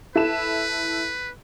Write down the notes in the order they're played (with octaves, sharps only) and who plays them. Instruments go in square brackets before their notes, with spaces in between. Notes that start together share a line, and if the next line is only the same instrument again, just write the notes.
[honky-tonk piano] E4 A4 E7 [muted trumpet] B4